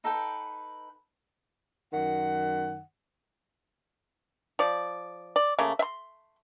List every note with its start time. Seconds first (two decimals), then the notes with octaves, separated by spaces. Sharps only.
0.04 D#4 A4 B4 G5
1.93 F#2 D#3 F#5
4.59 F3 D5
5.36 D5
5.59 C#3 A3 A#3
5.79 E5 C6